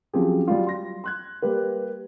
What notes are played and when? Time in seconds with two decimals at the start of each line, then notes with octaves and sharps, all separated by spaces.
0.13 F3 F#3 C4 C#4 G4 G#4
0.48 F#3 G3 F4
0.66 C6 A#6
1.04 C6 F#6 G#6
1.42 G3 A#3 G4 B4